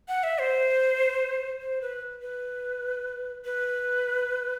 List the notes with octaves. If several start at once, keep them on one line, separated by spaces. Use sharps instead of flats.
F#5
E5
C5
C5
B4
B4
B4